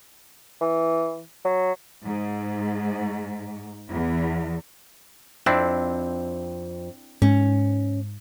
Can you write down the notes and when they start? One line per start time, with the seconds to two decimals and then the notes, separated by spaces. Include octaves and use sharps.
0.61 E3
1.45 F#3
2.03 G#2
3.88 E2
5.46 F2 C4 D4 E4
7.22 G#2 C#4